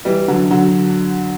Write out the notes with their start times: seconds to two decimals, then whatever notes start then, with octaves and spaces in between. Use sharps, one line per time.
0.05 E3 G3
0.28 D3 F#3
0.51 D3 F#3